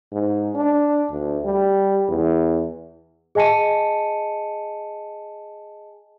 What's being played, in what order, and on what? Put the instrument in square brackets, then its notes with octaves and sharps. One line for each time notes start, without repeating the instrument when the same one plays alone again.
[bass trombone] G#2
D4
D2
G3
E2
[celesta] G#4 D#5 G#5 A5 C#7 D#7